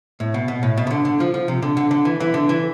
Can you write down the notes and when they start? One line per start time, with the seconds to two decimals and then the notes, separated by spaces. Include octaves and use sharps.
0.20 A2
0.34 B2
0.48 B2
0.63 A2
0.77 B2
0.87 C3
0.91 D3
1.05 D3
1.20 F3
1.34 F3
1.48 C3
1.62 D3
1.77 D3
1.91 D3
2.05 E3
2.20 E3
2.34 D3
2.49 E3